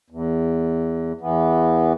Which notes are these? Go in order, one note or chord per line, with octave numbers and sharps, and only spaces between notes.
E2
E2 E3 B3